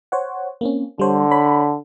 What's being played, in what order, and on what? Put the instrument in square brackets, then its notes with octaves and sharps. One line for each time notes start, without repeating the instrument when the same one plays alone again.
[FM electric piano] C5 C#5 F#5
A#3 C4 C#4
[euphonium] D3 [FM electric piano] G3 C5 C#5
[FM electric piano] C#5 B5